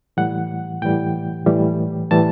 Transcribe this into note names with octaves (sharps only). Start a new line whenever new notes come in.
A2 E3 G3 F#5
A2 E3 G3 G5
A2 E3 G3
A2 E3 G3 A5